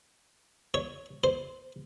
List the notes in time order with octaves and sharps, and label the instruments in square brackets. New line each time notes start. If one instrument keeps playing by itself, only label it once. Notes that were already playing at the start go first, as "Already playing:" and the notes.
[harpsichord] C#5
C5